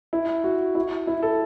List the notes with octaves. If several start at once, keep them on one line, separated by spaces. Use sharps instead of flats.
E4
F#4
E4
E4
A4